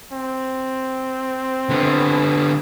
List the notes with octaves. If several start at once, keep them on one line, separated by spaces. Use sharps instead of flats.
C4
D3 B3